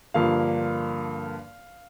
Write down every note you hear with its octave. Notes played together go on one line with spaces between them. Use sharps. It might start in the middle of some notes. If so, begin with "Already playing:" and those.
G2 D3 F3 A#3 F5